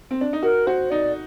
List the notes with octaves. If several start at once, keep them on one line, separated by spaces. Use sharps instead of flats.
C4
D4
D#4
F#4 A#4
F#4 C5
D#4 D5